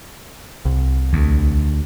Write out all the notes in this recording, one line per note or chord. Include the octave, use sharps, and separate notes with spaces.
C2
D2